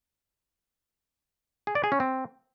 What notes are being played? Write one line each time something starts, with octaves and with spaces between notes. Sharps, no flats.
G#4
D5
G#4
C#4
C4